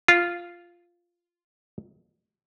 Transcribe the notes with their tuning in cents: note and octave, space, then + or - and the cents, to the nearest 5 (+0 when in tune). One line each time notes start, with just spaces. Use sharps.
F4 -5